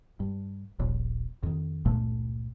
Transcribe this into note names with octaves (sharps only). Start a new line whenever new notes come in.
G2
D#1 A#1
F2 D#3
G1 C#2 A#2 A3